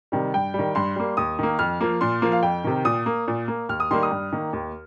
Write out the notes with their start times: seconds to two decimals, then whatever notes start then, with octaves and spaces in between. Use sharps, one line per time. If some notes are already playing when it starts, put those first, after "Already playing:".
0.12 C3 D#3 G3
0.34 G2 G5
0.54 D#3 G3
0.75 G2 C6
0.96 G3 A#3
1.17 D#2 D#6
1.39 D#3 A#3
1.59 F2 F6
1.81 F3 A#3
2.01 A#2 C6
2.22 F3 A#3
2.32 F5
2.43 F2 G5
2.64 C3 D#3
2.85 A#2 D#6
3.06 A#3
3.28 A#2
3.48 A#3
3.69 D#2 F6
3.80 D#6
3.91 D#3 G3 A#3 C6
4.03 D#6
4.11 G2
4.32 D#3 A#3
4.53 D#2